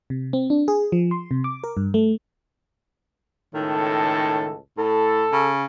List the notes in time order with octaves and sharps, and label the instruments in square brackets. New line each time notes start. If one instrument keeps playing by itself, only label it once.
[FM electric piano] C3
C4
D4
G#4
F3
C6
C3
D6
A#4
G2
A3
[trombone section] C#2 A2 A4 [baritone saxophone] D#3
[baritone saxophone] A2 [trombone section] A4
[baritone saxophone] C#3